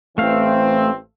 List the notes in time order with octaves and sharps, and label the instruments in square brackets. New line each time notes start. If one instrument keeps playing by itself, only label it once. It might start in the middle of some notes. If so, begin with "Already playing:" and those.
[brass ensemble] A1 E3 C4 [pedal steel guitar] A3 F5